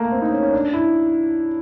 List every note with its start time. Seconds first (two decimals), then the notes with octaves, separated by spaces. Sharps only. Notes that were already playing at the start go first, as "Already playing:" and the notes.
Already playing: A3 A#3
0.12 C4
0.22 D#4
0.32 C#4
0.43 C#4
0.53 D4
0.73 E4